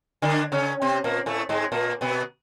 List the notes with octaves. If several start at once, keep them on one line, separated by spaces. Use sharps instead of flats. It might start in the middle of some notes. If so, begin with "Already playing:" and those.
D3 D4
C#3 C#4
C3 C4
A#2 A#3
A2 A3
G#2 G#3
A#2 A#3
B2 B3